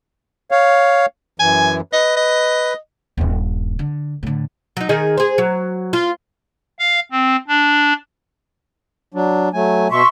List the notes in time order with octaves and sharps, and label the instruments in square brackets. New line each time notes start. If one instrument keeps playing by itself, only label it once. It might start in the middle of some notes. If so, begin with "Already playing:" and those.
[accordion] C#5 F5
[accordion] F#2 E3 [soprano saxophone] G#5
[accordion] B4 [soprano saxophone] D#5
[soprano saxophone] D#5
[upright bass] D#1 G2
D3
A2 D3
[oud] F#3 D#4
D#3 G#4 D#5
G#4 C5
F#3
F4
[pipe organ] F5
C4
D4
[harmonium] F#3 D4
F#3 A3 G#5
[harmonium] B2 [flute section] E5 C6 C#6